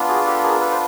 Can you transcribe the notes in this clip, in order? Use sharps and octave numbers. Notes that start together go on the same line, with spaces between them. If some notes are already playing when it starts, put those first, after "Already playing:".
Already playing: B3 D4 F4
F#4 G#4
G4 A4
G#4 A#4
A4 B4
C5